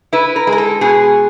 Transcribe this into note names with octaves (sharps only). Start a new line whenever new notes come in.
E4 B4
A#4
G#3
A#4
A4
B2 G#4